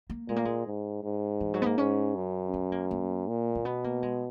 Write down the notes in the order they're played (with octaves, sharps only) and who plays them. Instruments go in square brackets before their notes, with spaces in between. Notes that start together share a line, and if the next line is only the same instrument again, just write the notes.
[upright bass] A#3
[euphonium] A#2 [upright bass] G#3
[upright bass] A#3
G#3
[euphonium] G#2
G#2
[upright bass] E3
F#3
B3
A#3
[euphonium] G#2 [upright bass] C#4
[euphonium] F#2
[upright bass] C#4
A#3
A#3
[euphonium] A#2
[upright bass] A#3
[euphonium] B2 [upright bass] B3
[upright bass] A#3
G#3